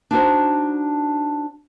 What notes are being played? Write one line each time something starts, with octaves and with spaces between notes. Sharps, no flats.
D4 D#4 F#4 C5